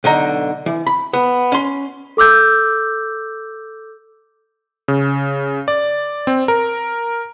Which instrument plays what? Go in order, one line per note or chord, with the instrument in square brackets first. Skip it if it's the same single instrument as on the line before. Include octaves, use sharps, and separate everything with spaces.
[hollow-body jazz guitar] B1 D3 D#4 A#5
E3
B5
B3
C#4 C6
[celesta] A4 D6 E6 G6
[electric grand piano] C#3
D5
C4
A#4